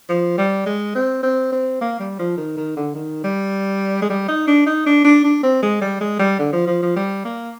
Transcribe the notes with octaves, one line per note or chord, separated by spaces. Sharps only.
F3
G3
G#3
C4
C4
C4
A#3
G3
F3
D#3
D#3
D3
D#3
G3
G#3
G3
D#4
D4
D#4
D4
D4
D4
C4
G#3
G3
G#3
G3
D3
F3
F3
F3
G3
A#3